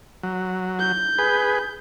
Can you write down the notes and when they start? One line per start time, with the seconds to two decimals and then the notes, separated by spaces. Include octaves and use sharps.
0.23 F#3
0.79 G6
1.18 G#4 B4